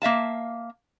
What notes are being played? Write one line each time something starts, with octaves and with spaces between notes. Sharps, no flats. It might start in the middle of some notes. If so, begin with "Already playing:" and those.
A#3 E5 F5 A5